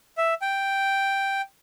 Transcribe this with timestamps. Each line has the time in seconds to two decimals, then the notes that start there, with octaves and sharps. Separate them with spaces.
0.18 E5
0.42 G5